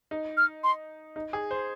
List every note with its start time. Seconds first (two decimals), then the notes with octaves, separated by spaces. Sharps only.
0.11 D#4
0.37 F6
0.64 C6
1.16 D#4
1.33 G#4
1.51 C5